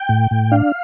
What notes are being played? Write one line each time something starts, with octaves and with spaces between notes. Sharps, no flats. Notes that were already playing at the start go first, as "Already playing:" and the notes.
Already playing: G5
A2
A2
D4 F5